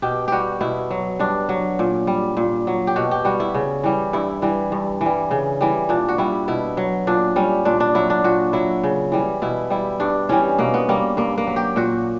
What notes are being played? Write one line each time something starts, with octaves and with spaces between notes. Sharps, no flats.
B2 G4
G3 F#4 G4
B2 E4
F#3
G2 D4
F#3
A#2
G3
A#2
F#3
G4
B2 F#4
G4
G3 F#4
E4
C#3
E3 G3
G2 E4
E3 G3
G2
E3
G3
C#3
E3 G3
A#2 D4
F#4
G3 E4
B2 E4
F#3
A#2 D4
G3 C#4
A#2 D4
D4
F#3 E4
D4
A#2 F#4
F#3 E4
C#3
E3 G3
B2 E4
G3 E4
G2 D4
E3 G3 C#4
B2 A#3
B3
G3 A#3
G2 A#3
A#3
F#3
G4
A#2 F#4